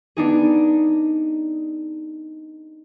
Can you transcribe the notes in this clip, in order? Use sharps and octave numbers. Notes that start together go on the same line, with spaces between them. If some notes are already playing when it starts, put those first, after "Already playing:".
B3 D4 D#4 G#4